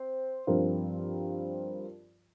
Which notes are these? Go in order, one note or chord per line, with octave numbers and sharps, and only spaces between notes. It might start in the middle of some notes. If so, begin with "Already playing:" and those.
Already playing: C4 C5
G2 F3 C4 F4 A#4